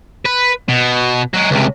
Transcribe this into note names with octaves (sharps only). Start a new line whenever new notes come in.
B4
B2
F#3 G#3
C#2 C3